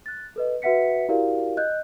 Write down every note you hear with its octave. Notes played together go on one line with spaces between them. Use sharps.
F#6 A6
A4 B4 D#5
F#4 B4 E5 F#5 B6 C#7
E4 F#4 G4 A#4 D5 F5
D#5 F#6 G6